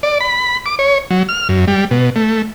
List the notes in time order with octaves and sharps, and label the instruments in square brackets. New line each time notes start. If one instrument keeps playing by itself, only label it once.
[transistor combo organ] D5
B5
D6
C#5
F#3
F6
F#2
G3
B2
A3